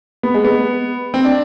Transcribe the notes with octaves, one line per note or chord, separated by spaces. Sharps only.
B3
G#3
B3
C4
D4